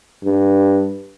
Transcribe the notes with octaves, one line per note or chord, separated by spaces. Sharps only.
G2